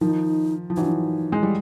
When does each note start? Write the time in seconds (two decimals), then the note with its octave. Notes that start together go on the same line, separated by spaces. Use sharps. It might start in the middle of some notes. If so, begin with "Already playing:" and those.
0.01 D#3 F3 D#4
0.70 F3
0.76 E3 F#3 D#4
0.84 D4
0.92 D#4
1.32 G#3
1.43 G3